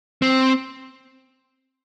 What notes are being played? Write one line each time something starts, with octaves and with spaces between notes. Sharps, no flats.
C4